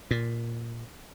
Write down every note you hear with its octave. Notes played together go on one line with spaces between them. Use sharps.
A#2